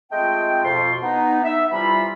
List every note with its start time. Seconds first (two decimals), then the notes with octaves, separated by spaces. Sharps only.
0.12 G#3 A3 C4 F4 D#5 G5
0.64 F2 B2 F4 C6
1.02 B3 D#4
1.43 E5
1.71 C3 E3 G3 F4 B5